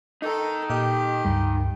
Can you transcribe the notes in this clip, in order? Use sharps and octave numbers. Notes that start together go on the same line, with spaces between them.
D#4 A4 A#4
A#2 G4 D#5
C#2 G2 G3